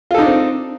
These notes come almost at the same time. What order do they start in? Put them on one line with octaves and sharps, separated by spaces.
F4 A4 D#4 D4 C4